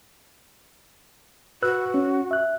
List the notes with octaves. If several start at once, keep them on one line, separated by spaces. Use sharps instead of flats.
F#4 B4 E6 F#6
C#4
E5 F#6